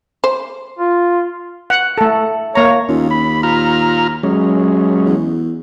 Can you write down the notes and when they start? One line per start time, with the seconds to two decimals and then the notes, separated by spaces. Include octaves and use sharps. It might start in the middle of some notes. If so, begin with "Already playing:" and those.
0.24 C5
0.79 F4
1.70 F#5
1.98 A3 A4
2.55 A#3 C#5 A#5
2.89 D#2 C#4 F4
3.11 B5
3.43 F4 A#5 F6
4.23 F#3 G#3 C#4
5.06 E2